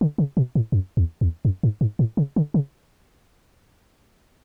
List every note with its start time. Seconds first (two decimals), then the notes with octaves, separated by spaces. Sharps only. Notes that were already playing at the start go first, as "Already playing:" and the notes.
0.01 D3
0.18 C#3
0.37 B2
0.55 A2
0.72 F#2
0.97 E2
1.21 E2
1.45 F#2
1.63 G#2
1.81 G#2
1.99 A2
2.17 C#3
2.36 D3
2.54 C#3